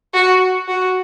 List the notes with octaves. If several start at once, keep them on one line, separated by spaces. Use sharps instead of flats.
F#4
F#4